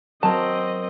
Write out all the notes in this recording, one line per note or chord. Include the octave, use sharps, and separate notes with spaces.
F#3 C4 A#4 D#5 A5